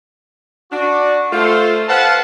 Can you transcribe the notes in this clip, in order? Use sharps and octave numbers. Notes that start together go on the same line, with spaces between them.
D4 F#4
A3 F4 C5
B4 C5 F5 F#5 A5